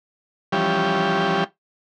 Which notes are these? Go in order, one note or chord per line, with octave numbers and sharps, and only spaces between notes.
E3 F3 G3 C#4 G4